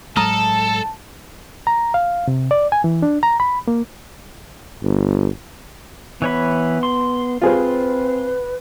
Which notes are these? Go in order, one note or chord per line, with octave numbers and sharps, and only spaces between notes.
A2 F#3 G#3 A4 A5 A#5 D#6 F6
A#5
F5
C3
D5
G#5
E3
D4
A#5
B5
A#3
G1
E3 B3 C#5 B5
C6
C4 F4 G#4 B4 C5